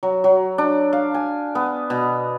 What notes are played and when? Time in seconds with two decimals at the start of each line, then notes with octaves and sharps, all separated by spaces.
0.03 F#3
0.24 F#3
0.58 D4
0.93 F5
1.14 G#5
1.55 B3
1.90 B2